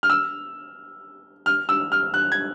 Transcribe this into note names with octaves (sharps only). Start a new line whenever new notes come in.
F6
E6
F6
E6
F6
F#6
G#6